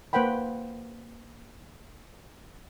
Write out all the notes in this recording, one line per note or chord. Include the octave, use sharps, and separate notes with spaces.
A#3 B4 C5 F#5 G5 B5